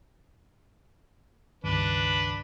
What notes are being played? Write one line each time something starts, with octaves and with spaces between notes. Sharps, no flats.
C#2 G2 D#3 D4 B4